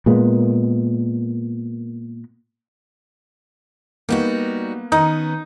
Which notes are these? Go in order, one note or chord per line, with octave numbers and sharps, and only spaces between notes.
A#2 G#3 A#3 B3
G3 A#3 B3 D#4 F#4 B4
D#3 B3 C#4 D#4